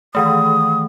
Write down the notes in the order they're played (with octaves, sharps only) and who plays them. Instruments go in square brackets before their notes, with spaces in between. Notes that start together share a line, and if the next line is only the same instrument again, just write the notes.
[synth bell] D#3 E3 A3 [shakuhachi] D#6